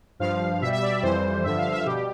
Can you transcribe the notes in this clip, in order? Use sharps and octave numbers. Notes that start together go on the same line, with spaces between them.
G2 F3 F5
B2 G3 E5
E5
D5
F2 E3 G3 C5
G2 D3 F3 E5
F5
E5
B2 G3 G4